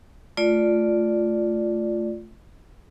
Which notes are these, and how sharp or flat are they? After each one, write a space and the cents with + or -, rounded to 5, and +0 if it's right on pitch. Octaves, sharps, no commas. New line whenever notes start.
A3 +0 F4 +0 D5 +0